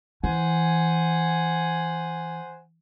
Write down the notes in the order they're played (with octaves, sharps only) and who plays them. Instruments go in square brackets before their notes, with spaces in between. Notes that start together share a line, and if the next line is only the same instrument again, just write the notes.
[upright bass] E3 [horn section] C5 F#5 G#5